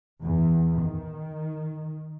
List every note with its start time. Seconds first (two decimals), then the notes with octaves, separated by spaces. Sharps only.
0.22 E2
0.83 D#3